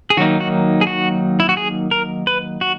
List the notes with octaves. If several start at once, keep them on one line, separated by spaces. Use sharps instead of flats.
G#4
D#3 F#3 A#3 D#4 F#4
F#4
G#4
F#4
E4
F#4
G#4
A#4
B4
F#4